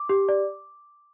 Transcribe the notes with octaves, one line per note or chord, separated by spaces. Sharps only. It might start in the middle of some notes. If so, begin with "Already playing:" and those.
Already playing: D6
G4
D5